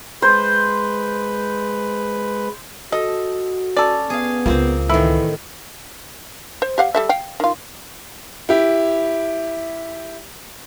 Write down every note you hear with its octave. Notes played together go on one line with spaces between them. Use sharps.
G#3 B4 C5
F#4 A4 D#5
C#4 A4 D5
B3 G#4 F5
C#2 A#3 C4 F4 C5
A2 D#3 E3 E4
C5
G4 F5 F#5
G3 A4 E5
F5 G5
D#3 F4
E4 G4